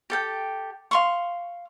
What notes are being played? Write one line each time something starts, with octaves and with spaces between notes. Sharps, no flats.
G4 A4 G5
F5 C6 C#6